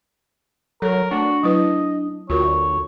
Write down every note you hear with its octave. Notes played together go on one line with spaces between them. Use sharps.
F#3 A4 A#4 C#5
A3 D4 F#4
F#3 E4 B4 D#5
D2 F4 F#4 A#4 C#5